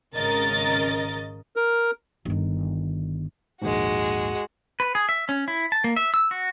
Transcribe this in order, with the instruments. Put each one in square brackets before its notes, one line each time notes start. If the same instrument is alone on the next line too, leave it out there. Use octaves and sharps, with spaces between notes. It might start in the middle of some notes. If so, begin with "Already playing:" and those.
[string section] G#1 C#3 A#4 D#5 A6
[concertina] A#4
[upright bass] G1 D#3
[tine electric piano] A#1 D#2 G#2 [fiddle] G#3 F#4
[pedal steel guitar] B4
G#4
E5
C#4
E4
A5
A#3
E5
E6
F#4